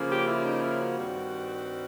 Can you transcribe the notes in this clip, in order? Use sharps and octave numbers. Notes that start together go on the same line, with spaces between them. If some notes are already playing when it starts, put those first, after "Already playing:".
Already playing: C#3 F3 A#3 C#4
G4
E4
D#4
E4
F#4
G2 D#3 G3 C4